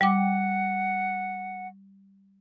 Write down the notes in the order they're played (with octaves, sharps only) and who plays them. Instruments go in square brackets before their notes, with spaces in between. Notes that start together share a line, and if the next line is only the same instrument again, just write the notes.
[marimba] G3 G5 D6 [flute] F#5